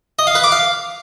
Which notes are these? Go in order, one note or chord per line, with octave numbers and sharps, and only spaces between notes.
D#5
F5
B4
D6
F5